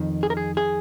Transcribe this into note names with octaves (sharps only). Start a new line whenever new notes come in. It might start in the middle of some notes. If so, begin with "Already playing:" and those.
Already playing: F2 D#3
G#4
A#4
G#4
G#4